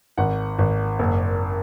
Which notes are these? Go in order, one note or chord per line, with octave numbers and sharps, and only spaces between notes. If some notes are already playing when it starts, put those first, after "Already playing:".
G#1 F#5
G#1
F#1